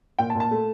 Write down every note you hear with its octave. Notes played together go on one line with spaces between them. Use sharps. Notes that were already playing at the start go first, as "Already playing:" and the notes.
A#2 G5
A5
A#2
A5
A3